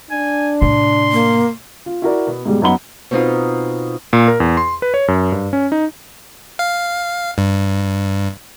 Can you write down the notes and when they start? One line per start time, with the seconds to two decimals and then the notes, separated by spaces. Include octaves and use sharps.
0.11 D4 G#5
0.62 A2 C3 C6
1.12 A#3
1.86 F4
2.02 E4 F#4 A#4 D5
2.27 B2 B3
2.45 G#2 B2 G3 G#3
2.62 F#2 B3 D#4 F#5 B5 G7
3.11 B2 C4 D#4 F4
4.13 A#2
4.28 A#4
4.40 E2
4.57 C6
4.82 B4
4.94 C#5
5.08 F#2
5.32 G2
5.53 C#4
5.72 D#4
6.59 F5
7.38 G2